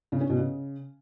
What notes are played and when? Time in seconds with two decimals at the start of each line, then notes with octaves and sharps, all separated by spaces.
0.12 C#3
0.21 C#4
0.30 B2
0.38 C#3